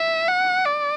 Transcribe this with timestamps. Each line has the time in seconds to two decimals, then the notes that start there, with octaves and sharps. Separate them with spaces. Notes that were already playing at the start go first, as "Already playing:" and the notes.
Already playing: E5
0.29 F#5
0.65 D5